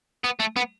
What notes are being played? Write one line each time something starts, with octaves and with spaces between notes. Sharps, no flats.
B3
A3
B3